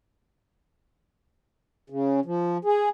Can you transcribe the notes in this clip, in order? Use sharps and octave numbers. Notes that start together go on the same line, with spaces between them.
C#3
F3
G#4